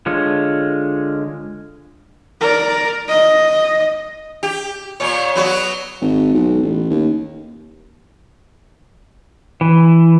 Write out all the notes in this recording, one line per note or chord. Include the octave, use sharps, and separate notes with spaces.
D3 G#3 F4 C#5
A#4 D5
D#5
G4
A#2 C#5
F#3 B3 F#4
G#1
B1
A1
D#2
E3